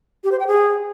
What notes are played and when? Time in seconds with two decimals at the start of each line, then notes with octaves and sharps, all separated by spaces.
0.24 G4
0.32 C5
0.39 G5
0.47 G#4